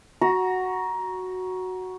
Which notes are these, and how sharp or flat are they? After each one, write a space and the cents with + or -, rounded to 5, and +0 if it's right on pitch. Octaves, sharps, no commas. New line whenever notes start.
F#4 +0 A#5 +20